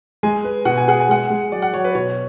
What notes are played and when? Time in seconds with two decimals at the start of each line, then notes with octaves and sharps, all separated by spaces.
0.23 G#3 G#5
0.44 B4
0.65 B2 F#5
0.77 G#5
0.88 G#4 F#5
1.00 G#5
1.09 G#3 F#5
1.30 G#3
1.52 F#3 D5
1.62 F#5
1.74 F#3 C#5
1.84 B4
1.95 B2 C#5